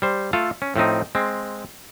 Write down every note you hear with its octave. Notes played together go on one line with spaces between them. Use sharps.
G3 C5
A3 F4 A4 F5
C#4
A2 F3 C4 D#4
G#3 C4